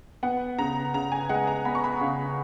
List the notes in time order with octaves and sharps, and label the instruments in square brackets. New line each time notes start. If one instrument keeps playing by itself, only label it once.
[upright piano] B3 F#5
C#3 A#5
C#3 A#5
G#5
G#3 F#5
A#5
B3 B5
C#6
B5
C#3 F5